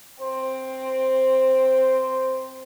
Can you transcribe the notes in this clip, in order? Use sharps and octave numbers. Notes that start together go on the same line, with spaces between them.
C4 C5